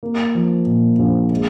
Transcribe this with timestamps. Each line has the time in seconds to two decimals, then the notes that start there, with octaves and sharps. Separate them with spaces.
0.03 A#3
0.35 F3
0.67 A#2
0.99 A#1
1.30 G#3